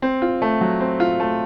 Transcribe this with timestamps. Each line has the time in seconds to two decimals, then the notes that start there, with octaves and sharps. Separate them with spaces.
0.02 C4
0.22 F4
0.42 A3
0.61 F#3
0.80 C4
1.00 F4
1.20 A3